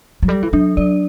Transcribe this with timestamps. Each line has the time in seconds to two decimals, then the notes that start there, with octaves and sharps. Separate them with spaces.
0.22 F#3
0.28 G3 A4
0.43 E3
0.53 F#3 D4
0.77 F#3 D5